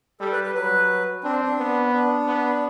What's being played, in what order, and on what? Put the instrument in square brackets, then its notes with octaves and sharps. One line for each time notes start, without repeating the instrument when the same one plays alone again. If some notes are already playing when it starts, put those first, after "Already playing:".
[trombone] G3 [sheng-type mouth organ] A4
[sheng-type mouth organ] B4
B4
[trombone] F#3 [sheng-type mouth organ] B4
[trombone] C4 [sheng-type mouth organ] D4
[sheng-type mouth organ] D4
[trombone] B3
[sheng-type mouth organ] D4
[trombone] B3